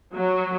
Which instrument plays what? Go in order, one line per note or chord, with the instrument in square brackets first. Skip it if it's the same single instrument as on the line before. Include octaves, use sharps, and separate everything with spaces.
[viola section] F#3